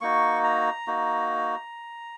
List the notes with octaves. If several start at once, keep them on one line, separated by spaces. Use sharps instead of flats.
A#3 D#4 F#4 C#6
A#5
A#3 D#4 F#4